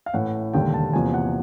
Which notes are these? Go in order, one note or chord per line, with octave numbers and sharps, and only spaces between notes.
F5
A1 A2 E3 F#5
E1 D#2 D3 G3 G5
A5
E2 C3 F3 A#3 G#5
F#5